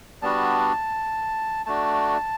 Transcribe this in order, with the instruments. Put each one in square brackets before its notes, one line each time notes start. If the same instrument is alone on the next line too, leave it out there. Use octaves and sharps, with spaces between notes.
[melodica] G3 B3 D4 F#4 A5
A3 D4 F#4 A5